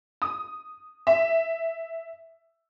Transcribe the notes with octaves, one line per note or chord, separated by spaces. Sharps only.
D#6
E5